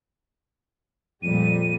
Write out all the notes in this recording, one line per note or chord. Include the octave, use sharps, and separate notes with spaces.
F2 A#2 G3 G#3 D#7